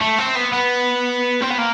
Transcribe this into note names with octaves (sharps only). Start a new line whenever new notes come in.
A3
C4
B3
B3
C4
B3
A#3